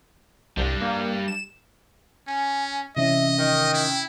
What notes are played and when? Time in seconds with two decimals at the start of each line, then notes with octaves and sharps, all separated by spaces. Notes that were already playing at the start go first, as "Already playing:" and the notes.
0.57 C2 G3 D4
0.81 A#3
1.28 E7
2.28 C#4 G#5
2.97 C3 E3 C#4 D#5 E5
3.38 D#3 G5
3.74 E4